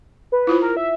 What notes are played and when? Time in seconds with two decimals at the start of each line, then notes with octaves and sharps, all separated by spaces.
0.32 B4
0.47 E4 F4 C5
0.62 A#4
0.77 E5